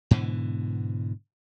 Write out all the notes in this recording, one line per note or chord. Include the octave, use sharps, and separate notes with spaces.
G#2 B2 D3 E3